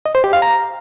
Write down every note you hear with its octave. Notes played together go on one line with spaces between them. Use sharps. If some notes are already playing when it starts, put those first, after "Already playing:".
D#5
C5
G4
F5
A#5